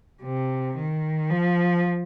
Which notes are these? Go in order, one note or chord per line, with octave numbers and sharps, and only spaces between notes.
C3
D#3
F3